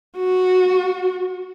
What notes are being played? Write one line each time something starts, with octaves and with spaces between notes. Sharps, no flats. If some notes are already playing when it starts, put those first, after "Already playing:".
F#4